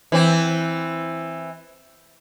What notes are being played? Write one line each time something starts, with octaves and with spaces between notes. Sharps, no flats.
E3 C4